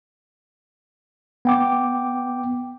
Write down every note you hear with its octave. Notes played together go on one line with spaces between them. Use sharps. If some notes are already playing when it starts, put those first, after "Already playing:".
B3 G5 D6